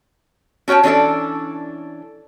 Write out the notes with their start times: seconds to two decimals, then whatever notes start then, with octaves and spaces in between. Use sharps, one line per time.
0.68 C#4 F#4 C#5 G5 A5
0.83 E3 C#4 D4 A4 D5